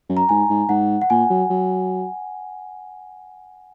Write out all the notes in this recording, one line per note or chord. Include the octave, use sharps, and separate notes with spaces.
F#2
A#5
G#2 G#5
G#2
G#2 F#5
F#5
A#2 G#5
F#3
F#3